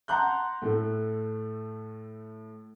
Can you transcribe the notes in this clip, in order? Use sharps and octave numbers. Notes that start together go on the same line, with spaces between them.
F#5 A5 A#5 C6 F#6 G6
A2 A3